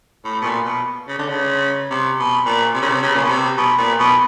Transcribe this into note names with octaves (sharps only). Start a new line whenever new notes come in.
A2
B2
A#2
B2
C#3
D3
C#3
C3
B2
A#2
C3
C#3
C3
C#3
A#2
B2
C3
B2
A#2
B2